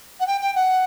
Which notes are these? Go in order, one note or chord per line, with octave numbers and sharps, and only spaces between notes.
F#5
G5
G5
F#5